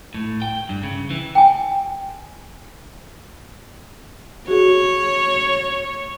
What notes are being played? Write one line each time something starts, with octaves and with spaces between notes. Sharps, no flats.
A2
G5
G2
C#3
E3
G5 G#5
F#4 G#4 C#5